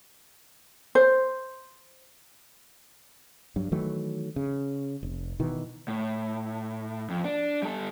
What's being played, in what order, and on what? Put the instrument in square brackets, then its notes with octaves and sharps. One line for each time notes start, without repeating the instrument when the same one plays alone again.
[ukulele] C5
[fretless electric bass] G2 F#3
D#3 E3 F#3 A3
C#3
F1
B2 D#3 E3
[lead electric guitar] A2
F2
D4
G3 A4